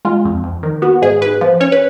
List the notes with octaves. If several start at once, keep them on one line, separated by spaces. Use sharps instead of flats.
G#3 F4
F2
F2
D#3
B3 F#4
G#2 G#4
G#2 B4
F3
C#4 C#5
B4